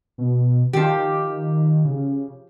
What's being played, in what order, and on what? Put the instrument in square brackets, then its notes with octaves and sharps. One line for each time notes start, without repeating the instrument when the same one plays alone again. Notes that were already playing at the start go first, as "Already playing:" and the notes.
[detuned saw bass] B2
[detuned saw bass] D#3 [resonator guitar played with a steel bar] F3 G4
[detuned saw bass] C#3